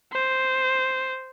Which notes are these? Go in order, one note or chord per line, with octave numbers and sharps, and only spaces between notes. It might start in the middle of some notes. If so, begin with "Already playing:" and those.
C5